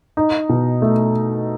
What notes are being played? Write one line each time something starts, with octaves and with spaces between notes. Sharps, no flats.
D#4
B2
A3